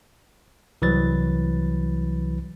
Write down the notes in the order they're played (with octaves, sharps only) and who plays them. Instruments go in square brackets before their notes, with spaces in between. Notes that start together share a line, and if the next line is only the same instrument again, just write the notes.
[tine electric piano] C2 E3 F#3 B4 A6